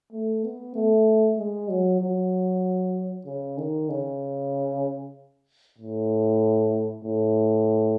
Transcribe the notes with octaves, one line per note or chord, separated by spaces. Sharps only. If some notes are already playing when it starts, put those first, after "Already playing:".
A3
B3
A3
G#3
F#3
F#3
C#3
D#3
C#3
A2
A2